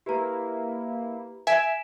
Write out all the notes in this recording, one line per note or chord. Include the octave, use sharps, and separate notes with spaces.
A#3 E4 G4 B4 A#5
E5 G#5 B6 D7 E7